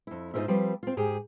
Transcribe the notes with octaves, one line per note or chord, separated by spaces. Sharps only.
F2 E4
G#2 D#4 F4 A#4 C5 E5
F3 G3 C4 B4
C4 F4
G#2 G4 G#4